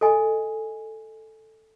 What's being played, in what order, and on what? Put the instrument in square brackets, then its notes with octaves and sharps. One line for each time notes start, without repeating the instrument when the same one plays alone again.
[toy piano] A4 D#5 G#5